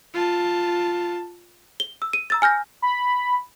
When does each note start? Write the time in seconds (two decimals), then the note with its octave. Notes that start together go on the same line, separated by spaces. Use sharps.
0.14 F4 A5
1.80 G7
2.02 E6
2.13 D#7
2.30 A#5 E6 A6
2.42 G#5 F6 G6 A#6
2.82 B5